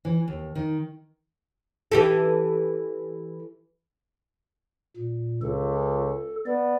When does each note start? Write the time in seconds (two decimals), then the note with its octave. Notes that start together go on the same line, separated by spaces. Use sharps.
0.05 E3
0.28 D#2
0.55 D#3
1.92 E3 G4 A4
4.97 A#2
5.42 C#2 A4
6.46 B3 D5